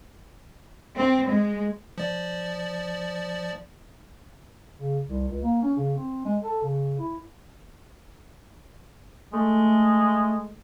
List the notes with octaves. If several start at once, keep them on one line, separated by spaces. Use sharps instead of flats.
C4
G#3
F3 D5
C#3
C2
C#2
A#3
C#4
C#3
C4
G#3
A4
C#3
E4
G#3 A3